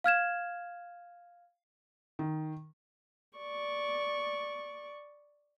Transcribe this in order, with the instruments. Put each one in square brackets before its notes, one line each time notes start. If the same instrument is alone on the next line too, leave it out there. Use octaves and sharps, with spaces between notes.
[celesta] F5 F6 G#6 E7
[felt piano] D#3
[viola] D5 C#6